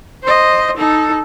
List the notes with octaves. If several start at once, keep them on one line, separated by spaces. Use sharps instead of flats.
C5 D#5
D#4 A4